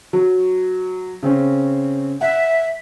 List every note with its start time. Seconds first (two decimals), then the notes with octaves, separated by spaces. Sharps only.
0.13 F#3
1.23 C#3 C4 C#4
2.21 E5 F#5